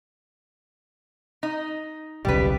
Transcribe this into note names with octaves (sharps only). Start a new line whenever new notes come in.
D#4
D#1 B1 C#3 G3 B4